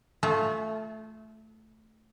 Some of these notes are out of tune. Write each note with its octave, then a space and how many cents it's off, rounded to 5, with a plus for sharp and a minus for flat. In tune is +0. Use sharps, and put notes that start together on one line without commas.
A3 +0 F4 +0 A4 -40